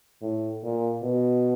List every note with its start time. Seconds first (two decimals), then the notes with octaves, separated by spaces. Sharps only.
0.22 A2
0.63 A#2
1.03 B2